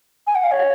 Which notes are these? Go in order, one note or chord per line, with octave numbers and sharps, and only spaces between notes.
G#5
F#5
F5
C#5